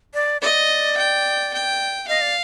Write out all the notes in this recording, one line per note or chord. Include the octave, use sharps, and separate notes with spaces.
D5
D5 D#5
G5
G5
D#5 F5
D5